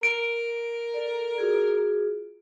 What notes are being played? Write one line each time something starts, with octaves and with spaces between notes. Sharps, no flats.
A#4 D7
A4 D5
F4 F#4 G#4